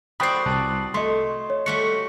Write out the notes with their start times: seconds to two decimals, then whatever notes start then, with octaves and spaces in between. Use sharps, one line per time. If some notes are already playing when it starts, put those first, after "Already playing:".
0.20 F#4 C5 D5 G5 B5 D#6 C7
0.46 C2 A5 F#6
0.94 A3 D#5 C6
1.50 C#5
1.66 G3 A3 F#4 C#7